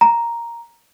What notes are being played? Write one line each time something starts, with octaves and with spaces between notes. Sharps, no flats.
A#5